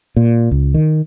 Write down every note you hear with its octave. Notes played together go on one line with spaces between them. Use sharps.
A#2
C#2
D#3